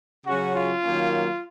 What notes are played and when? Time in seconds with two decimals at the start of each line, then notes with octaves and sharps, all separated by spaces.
0.27 C#3 F#3 C#4 F#4
0.55 F4
0.83 D#3 F#3 A#3 C#4